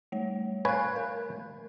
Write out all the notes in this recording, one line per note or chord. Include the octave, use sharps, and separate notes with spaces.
G3 A3 C#5
B4 C#5 F5 G#5 F#6
A#4